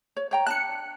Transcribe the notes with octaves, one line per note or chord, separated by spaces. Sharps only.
C#5
C#5 G5 A#5
D4 D#4 A5 F#6 C#7